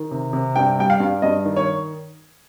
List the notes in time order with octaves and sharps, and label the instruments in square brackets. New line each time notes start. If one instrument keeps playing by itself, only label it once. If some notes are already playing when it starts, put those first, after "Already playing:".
Already playing: [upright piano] D#3
C3
C3
G2 G5
G3 G5
F5
G2
G2 D#5
D#3
C#5